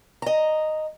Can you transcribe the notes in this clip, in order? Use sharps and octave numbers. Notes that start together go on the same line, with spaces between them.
D#5 A#5